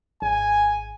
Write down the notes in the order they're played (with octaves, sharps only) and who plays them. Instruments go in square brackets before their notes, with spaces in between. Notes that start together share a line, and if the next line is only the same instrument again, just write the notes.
[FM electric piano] G#1 [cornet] G#5